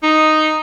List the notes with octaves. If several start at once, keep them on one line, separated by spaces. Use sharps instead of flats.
D#4